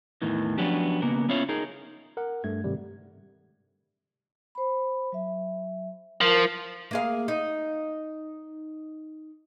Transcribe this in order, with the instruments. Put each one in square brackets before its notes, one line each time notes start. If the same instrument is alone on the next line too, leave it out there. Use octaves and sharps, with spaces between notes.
[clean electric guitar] E2 A2 D#3 E3
F3 F#3 B3 C#4 D4 G4
C#3 A#3 B3 A#4
B3 C#4 E4 F4 C#5
D#4 G#4 A#4
[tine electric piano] A#4 F#5
G2 A3 G#6
G#2 C3 D#3 G3
[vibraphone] C5 B5
F#3 E5
[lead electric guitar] F3 [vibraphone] A#4
[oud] A#3 G#4 F5
D#4